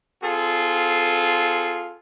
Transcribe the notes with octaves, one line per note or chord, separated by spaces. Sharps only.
C4 F4 G#4 A4